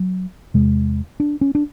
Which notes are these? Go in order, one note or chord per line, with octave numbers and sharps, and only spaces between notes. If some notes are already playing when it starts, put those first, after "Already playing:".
Already playing: F#3
E2 C3 G#3
D4
C#4
D4